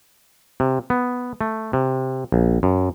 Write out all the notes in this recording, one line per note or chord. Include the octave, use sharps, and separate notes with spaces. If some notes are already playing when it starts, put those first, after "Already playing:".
C3
B3
A3
C3
A#1
F#2